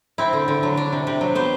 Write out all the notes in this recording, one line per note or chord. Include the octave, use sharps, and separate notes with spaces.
C4 E4
D3
D3
F#3
D4
C3
C3
F#3
B3 C5